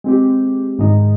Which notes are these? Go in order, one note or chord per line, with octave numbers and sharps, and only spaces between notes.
G#3 C4 G4
G#2 D#3 G#3 D#4